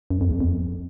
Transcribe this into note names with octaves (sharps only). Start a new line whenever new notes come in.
F#2
F2
E2
F2